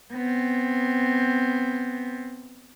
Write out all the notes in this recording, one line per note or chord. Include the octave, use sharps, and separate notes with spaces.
B3 C4